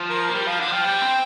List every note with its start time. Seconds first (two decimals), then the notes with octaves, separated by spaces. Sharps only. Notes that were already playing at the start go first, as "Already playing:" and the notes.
Already playing: F3
0.10 A#4
0.29 A#3
0.34 G3 A#4
0.47 F3 F5
0.59 D3 F5
0.67 G3
0.72 F3 G5
0.85 G3
1.02 C4